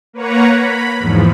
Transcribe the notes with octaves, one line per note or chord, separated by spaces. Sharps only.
A#3 B4 C#5 F#5 A#5
B5
E2 G#2 F3